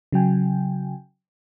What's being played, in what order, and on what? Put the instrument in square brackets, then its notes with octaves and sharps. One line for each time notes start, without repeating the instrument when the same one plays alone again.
[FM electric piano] C#3 F#3 G5 G#5